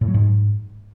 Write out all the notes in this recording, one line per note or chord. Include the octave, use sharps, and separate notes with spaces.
A2
F#3
G#2